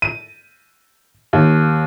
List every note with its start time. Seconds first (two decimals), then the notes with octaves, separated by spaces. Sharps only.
0.02 D#7
1.33 D#2